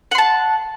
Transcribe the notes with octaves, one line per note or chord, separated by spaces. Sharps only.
F#5 A5 C6